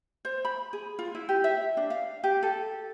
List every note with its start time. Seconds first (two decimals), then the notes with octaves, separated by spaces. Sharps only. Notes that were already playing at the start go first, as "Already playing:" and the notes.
0.25 C5
0.45 B5
0.73 G#4
0.99 F4
1.15 E4
1.29 G4
1.44 E5
1.77 D4
1.90 F5
2.24 G4
2.43 A4